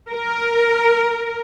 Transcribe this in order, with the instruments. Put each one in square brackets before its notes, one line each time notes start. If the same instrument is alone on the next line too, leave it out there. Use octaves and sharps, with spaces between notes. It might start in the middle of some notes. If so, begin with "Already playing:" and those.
[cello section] A#4